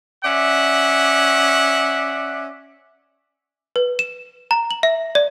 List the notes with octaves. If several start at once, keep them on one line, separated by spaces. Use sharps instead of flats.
C#4 D5 E5 F#5
B4
E7
A#5
F#7
E5
D5